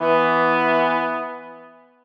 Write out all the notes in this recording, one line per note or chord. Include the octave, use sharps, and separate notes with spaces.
E3 B3